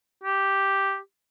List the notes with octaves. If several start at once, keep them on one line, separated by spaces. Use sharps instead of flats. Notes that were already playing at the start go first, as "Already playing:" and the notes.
G4